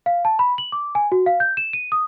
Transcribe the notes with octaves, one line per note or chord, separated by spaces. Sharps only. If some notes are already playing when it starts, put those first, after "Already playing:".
F5
A5
B5
F#7
D6
G#5
F#4
F5
G6
E7
D#7
D#6